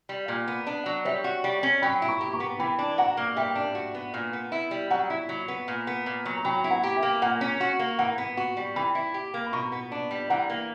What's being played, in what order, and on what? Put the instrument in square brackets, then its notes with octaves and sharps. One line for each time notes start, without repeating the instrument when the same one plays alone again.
[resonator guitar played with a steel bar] G3
A#2
B3
D4
F#3
[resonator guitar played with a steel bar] G3 [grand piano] C#5 E5
[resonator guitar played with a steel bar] F#4
G3
C#4
[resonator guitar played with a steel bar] F#3 [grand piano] G5 B5
[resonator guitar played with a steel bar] E4
[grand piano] A#5 C#6
[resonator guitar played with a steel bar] G4
[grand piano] A#5 C#6
[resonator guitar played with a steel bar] B3
[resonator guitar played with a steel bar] E3 [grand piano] G5 B5
[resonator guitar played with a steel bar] D4
[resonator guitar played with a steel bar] F#4 [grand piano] F#5 A#5
[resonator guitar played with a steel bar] A#3
[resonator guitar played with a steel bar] G3 [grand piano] E5 G5
[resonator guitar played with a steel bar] D4
F#4
B3
A#2
B3
E4
G3
[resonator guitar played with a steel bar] F#3 [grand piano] F#5 A#5
[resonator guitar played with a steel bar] E4
F#3
B3
A#2
B3
A#2
F#3
[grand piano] A#5
[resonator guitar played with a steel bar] F#3 [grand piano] G5 B5
[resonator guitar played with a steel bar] E4
[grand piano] F#5 A#5
[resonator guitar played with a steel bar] G4
[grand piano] E5 G5
[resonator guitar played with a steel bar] A#3
[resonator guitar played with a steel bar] A#2 [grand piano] F#5 A#5
[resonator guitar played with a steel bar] C#4
F#4
A#3
[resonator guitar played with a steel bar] E3 [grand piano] F#5 A#5
[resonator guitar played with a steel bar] B3
F#4
G3
[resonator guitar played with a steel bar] E3 [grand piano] G5 B5
[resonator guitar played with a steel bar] E4
G4
A#3
[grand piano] B5
[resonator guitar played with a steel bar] B2 [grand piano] A#5 C#6
[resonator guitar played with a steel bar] B3
D4
G3
[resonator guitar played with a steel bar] E3 [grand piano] F#5 A#5
[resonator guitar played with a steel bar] A#3